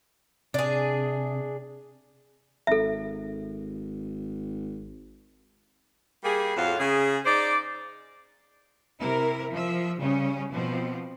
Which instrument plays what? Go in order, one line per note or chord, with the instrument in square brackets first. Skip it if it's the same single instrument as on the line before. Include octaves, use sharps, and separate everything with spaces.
[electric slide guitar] C3 [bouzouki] D4 G#4
[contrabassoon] G#1 [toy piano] A4 E5
[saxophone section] G3 A#3 G#4
F2 A2 F4 F#4 F5
C#3 G#4
D#4 C5 D5
[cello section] C3 E4 A#4
F3 E5
C#3 G3 C#4
B2 F3 C4